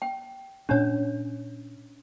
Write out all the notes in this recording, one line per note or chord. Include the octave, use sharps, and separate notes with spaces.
G5
A#2 A#3 C#4 D4 C#5